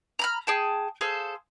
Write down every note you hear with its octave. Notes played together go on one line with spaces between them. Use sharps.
A#5 B5 F6
G#4 G5 A5
G#4 A4 C5 F5